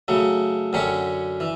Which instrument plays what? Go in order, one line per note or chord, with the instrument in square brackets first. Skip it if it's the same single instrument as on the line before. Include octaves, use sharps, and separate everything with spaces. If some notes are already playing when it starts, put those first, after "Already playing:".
[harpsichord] C#3 F#3 A3
F#2 D3 F#3 C#4 G4
E3